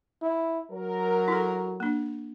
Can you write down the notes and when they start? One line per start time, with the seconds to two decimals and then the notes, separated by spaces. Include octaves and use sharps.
0.22 E4
0.71 F#3 A#4
1.28 E4 A4
1.80 A#3 D4